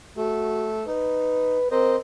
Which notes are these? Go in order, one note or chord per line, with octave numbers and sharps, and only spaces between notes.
A3 F#4
D#4 B4
C4 A#4 C5 D#5